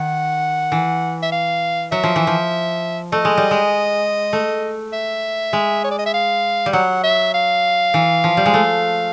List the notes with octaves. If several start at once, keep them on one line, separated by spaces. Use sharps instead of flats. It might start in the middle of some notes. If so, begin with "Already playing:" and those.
Already playing: D#3 F#5
E3
E5
F5
F#3 E5
F3
E3
F3
A3 D#5
G#3
G3
G#3
A3
E5
G#3
C#5
D5
D#5
E5
F5
G3
F#3 F#5
E5
F5
E3
F3
G3
G#3
A3